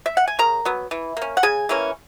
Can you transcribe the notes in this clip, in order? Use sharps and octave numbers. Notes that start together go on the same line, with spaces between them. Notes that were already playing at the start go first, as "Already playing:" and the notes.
E5
F#5
G#5
C#3 A#4 A#5
F#3 B3
E3
A#3 C#4
F#5
C#3 G#4 G#5
E3 A#3 C#4